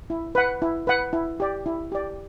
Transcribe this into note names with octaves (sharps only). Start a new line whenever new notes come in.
E4
B4 F#5
E4
B4 F#5
E4
G4 D5
E4
G4 D5